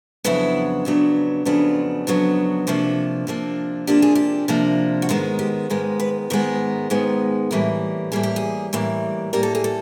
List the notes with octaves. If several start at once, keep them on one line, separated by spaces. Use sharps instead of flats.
F2 C#3 F#3 B3 D4 E4
F2 C#3 F#3 B3 D4
F2 C#3 F#3 B3 D4 F4
F2 C#3 F#3 B3 D4
C3 F3 A#3 D4 F#4
C3 F3 A#3 D4
C3 F3 A#3 D4 G4
G#4
G4
C3 F3 A#3 D4
F#4
G#2 D#3 G#3 B3 F4
G4
G#2 D#3 G#3 B3 A#4
B4
G#2 D#3 G#3 B3 A#4
G#2 D#3 G#3 B3
A2 E3 G3 A#3
A2 E3 G3 A#3 G#4
G4
G#4
A2 E3 G3 A#3
A2 E3 G3 A#3 A#4
A4
G#4
A4